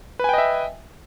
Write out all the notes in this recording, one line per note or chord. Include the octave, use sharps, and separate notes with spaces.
B4 D#5 E5 G5 G#5